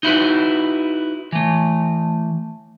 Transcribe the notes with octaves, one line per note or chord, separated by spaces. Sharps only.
D#4 E4 F#4 B4
E3 A3